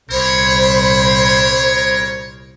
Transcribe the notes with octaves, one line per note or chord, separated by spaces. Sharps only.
C2 A#2 G#4 A#4 C5 C#5 B5